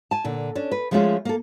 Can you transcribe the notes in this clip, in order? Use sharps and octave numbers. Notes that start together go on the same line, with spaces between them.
G#5 A5
A#2 D3
C#4 D4
B4
F3 G#3 A3 C#4 F4 G#4
A#3 A4